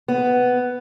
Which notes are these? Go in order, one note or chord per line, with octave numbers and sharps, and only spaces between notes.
B3